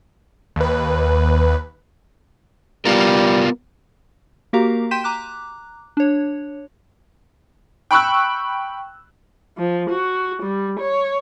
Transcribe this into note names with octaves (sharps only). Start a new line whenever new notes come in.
D#2 B4
G3 B3 F4 A#4
A#3 F#4 G4 A#4 F5 A#5
G5 C6 G6 B6 D#7 E7
A#5 D6 F#6
D4 C#5
G5 B5 C#6 E6 F#6
F3
F#4
G3
C#5